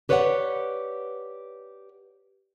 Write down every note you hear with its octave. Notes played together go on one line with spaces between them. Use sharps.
G4 B4 C#5 D5 E5 F#5